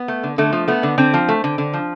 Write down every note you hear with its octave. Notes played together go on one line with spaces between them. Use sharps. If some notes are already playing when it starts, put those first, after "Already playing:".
Already playing: B3
A3
D3
D3 A3
F3
A3 B3
D3
D3 C4
F3
A3
D3
D3
F3